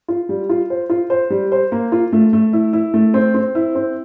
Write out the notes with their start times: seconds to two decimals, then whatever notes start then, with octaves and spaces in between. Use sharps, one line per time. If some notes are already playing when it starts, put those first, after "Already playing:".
0.08 F4
0.29 G3
0.49 F4
0.70 C5
0.90 F4
1.10 C5
1.30 G3
1.52 C5
1.72 A#3
1.92 F4
2.13 A3
2.33 A3
2.53 E4
2.73 E4
2.94 A3
3.14 C4
3.34 C4
3.55 E4
3.75 C4